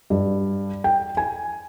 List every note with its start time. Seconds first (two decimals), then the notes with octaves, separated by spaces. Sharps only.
0.10 G2
0.84 G5
1.17 G#5